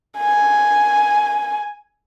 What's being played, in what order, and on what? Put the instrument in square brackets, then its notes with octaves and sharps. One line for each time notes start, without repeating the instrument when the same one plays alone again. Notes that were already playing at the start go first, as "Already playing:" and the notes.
[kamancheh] G#5